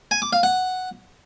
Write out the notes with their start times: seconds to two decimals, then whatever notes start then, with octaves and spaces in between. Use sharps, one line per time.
0.11 G#5
0.22 D6
0.33 F5
0.43 F#5